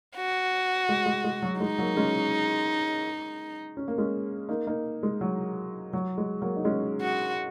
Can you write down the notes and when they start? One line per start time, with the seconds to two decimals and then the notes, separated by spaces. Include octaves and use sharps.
0.16 F#4
0.89 G#3
1.06 G#3
1.24 G#3
1.42 F#3
1.60 G#3 D#4
1.78 F#3 A#3
1.96 G#3 C#4
3.77 C#4
3.88 A#3
3.98 G#3 C#4
4.49 A#3 D#4
4.67 A#3 D#4
5.03 G#3
5.21 F#3
5.93 F#3
6.18 G#3
6.41 F#3 A#3
6.56 D#4
6.65 G#3 C#4
7.01 F#4